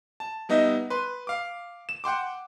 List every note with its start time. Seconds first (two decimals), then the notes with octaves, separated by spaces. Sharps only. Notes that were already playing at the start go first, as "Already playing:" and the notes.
0.20 A5
0.49 G3 B3 D#4 D#5 E5
0.90 B4 C6
1.27 F5 D6
1.89 E7
2.04 F#5 G5 C6 D6